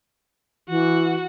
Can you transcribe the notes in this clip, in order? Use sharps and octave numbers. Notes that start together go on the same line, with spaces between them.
E3 F#4